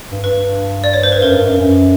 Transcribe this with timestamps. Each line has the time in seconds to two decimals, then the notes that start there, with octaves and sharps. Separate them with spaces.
0.11 G2
0.24 G2 B4
0.84 D5
0.94 C#5
1.03 C5
1.12 B4
1.22 F#2 A#4
1.34 G2
1.47 F#2
1.59 F#2